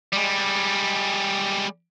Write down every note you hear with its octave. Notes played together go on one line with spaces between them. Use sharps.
G3 G#3